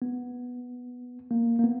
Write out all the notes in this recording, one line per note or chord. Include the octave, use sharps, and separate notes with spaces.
B3
A#3
A#3
B3